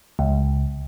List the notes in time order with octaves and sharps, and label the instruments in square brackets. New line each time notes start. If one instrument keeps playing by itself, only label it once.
[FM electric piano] C#2